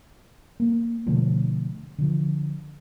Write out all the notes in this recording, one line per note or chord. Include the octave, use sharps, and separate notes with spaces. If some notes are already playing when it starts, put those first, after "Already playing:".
A#3
B2 D3 F3 A3
D3 F3